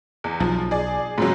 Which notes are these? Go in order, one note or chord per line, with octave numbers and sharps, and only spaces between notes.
E2
B1 F3
G#4 D5
G#2 C#3 F#3